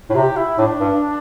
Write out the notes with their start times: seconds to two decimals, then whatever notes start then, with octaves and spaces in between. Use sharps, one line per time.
0.10 A2
0.15 C3 G4
0.36 E4
0.58 A2 D4
0.80 G2